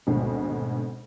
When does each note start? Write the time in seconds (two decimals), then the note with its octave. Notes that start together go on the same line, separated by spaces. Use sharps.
0.07 G#1 D2 B2 G#3